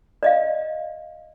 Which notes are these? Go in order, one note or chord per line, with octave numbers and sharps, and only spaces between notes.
D5 D#5 F5